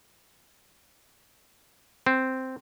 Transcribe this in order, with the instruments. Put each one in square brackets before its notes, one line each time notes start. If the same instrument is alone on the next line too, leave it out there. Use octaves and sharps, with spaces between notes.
[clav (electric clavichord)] C4